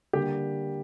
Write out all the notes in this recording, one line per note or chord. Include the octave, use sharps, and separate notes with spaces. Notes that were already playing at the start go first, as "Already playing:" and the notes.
D3 G3 A#3 G4 G5